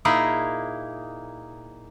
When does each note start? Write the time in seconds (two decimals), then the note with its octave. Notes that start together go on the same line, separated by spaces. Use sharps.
0.05 A#2 A#3 D#4 E4 G#4 A#4